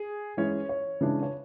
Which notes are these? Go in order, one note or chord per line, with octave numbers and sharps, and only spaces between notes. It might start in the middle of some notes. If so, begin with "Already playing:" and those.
Already playing: G#4
E3 G#3 C#4 C#5
C#5
C#3 E3 G#3 D4
C#5